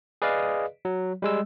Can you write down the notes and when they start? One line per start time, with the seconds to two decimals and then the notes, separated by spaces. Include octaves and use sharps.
0.22 G#4 B4 D5 D#5 F5
0.85 F#3
1.22 G3 G#3 E6